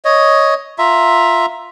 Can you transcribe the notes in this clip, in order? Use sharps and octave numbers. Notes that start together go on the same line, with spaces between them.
C#5 D#5
F4 E5 A#5